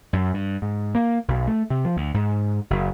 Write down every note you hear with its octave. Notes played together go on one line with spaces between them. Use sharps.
F#2
G2
G#2
A#3
B1
A3
C3
F3
D2
G#2
F#1